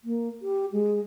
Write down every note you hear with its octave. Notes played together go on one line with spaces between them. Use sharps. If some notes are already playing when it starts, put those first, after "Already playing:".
A#3
G4
G#3